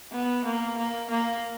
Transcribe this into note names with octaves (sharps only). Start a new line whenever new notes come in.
B3
A#3
A#3
A#3